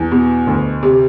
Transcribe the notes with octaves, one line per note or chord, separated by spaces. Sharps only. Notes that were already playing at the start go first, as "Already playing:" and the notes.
Already playing: E2
B2
D2
C3